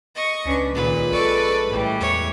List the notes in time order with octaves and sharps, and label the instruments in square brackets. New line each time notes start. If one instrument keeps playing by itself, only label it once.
[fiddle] D#5 C#6
[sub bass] C#2 [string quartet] C#4 D4 B4
[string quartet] A#2 D#3 [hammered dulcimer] G#3 C#4 F4 [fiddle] B4
[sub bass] A#1 [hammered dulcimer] G#3 [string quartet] A4 D5 C#6
[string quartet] A2 E3 G3
[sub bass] E2 [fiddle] C#5